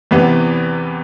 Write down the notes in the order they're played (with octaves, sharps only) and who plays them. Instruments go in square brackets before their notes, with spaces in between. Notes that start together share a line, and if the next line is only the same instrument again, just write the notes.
[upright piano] E2 C3 E3 B3